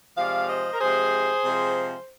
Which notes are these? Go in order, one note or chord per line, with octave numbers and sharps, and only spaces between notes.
C3 F3 G#3 D5 F5
C5 D#5
A#4
C3 F3 G#3 G#4 C5
C3 F3 G#3